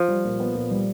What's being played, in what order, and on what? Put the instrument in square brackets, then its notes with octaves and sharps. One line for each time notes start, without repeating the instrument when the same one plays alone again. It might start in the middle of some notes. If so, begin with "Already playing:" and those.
Already playing: [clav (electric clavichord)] F3
[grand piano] G3
A#2
B3
A#2
G3